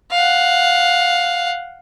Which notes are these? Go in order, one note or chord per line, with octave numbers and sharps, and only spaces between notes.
F5 F#5